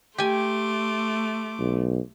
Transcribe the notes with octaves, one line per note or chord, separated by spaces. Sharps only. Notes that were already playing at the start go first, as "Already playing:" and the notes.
A3 G4 G#5 C6 D6
B1